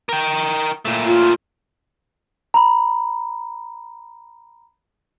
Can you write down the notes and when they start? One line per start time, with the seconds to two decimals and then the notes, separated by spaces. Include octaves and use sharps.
0.09 A#4 G5
0.85 A#2 A3
1.06 F4
2.54 A#5 B5